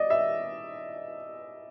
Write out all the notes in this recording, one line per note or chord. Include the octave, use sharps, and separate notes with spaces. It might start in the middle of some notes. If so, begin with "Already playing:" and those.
Already playing: D5 D#5
E5